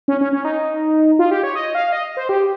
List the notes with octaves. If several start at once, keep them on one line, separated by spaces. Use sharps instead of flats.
C#4
C#4
C#4
D#4
F4
G4
C#5
D#5
F5
D#5
C5
G4